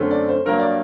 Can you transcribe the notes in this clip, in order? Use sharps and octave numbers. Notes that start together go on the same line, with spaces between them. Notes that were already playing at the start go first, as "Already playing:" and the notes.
Already playing: F#2 D3 A3 C4
D5
C5
G2 F#3 A#3 A#4
D5